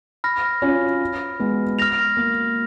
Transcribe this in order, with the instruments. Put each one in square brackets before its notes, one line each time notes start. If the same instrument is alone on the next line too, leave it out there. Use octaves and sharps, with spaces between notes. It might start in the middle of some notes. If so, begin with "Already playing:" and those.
[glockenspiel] B5 F6 A#6
[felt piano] C#4 F4
G#3 B3
[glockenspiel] F6 A#6 F7
[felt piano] A#3